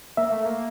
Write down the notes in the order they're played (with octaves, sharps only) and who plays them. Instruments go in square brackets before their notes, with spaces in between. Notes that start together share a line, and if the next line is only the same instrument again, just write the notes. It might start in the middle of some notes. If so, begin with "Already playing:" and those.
[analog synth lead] A#3 [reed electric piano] E5
[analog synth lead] A3
A#3